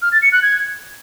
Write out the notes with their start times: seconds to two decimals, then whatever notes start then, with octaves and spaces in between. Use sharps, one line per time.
0.02 F6
0.12 A6
0.22 C#7
0.32 F#6
0.42 G#6